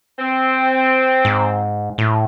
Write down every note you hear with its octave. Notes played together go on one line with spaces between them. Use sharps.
C4
G#2
A2